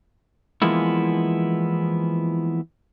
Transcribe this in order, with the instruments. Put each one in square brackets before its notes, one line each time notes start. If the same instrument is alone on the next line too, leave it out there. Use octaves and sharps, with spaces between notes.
[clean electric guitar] E3 F3 G#3 A#3 B3 E4